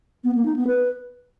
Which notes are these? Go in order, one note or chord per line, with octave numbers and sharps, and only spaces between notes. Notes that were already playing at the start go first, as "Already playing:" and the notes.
B3
A#3
D#4
B3
B4